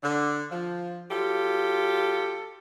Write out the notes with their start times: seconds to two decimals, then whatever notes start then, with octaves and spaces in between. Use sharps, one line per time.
0.03 D3
0.52 F3
1.11 F#3 F4 G4 A4